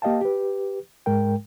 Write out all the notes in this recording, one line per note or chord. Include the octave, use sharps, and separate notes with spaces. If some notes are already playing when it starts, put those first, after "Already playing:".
A#3 G4 D#5 F5 G5 A5
G4 B4
G#2 G#3 A#4 G5